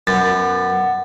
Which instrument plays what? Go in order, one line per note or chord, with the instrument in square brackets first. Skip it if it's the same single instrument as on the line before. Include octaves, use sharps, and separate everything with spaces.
[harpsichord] F#2 [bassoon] B3 [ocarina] F#5 [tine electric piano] A6